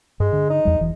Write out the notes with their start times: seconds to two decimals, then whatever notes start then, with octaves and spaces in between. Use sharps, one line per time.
0.20 G2 G#3
0.33 D3
0.50 D#4
0.65 E2 G3
0.81 E1 E3